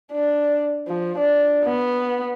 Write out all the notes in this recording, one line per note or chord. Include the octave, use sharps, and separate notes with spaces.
D4
F3
D4
B3